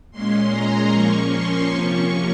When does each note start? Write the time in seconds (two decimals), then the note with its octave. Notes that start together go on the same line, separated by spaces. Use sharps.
0.11 A#2 G#3 C#4 C6
0.49 A#5
0.88 A#2 F3 A#3 C#4 C#6
1.28 C6
1.67 C3 F3 A#3 C#4 C#6